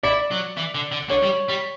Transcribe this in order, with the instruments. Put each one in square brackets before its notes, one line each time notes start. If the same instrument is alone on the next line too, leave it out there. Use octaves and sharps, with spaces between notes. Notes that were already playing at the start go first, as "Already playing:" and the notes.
[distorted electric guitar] E4 [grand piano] D5
[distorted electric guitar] F#3
E3
D3
D3
[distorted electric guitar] D3 [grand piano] C#5
[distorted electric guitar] G3
G3